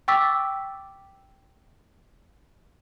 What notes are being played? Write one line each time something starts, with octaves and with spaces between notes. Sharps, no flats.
G5 C#6 D6 E6 A6 B6